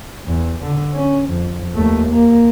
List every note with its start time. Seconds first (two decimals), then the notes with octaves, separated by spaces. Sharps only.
0.27 E2
0.64 D3
0.94 C#4
1.30 F2
1.75 D#2 A3
2.08 A#3